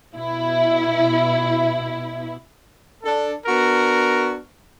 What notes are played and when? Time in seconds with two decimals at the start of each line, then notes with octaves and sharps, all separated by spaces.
0.15 B2 E4
3.03 D4 A4
3.46 B3 D4 F#4 A#4